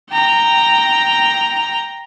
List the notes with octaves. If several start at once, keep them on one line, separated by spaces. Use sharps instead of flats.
G5 A#5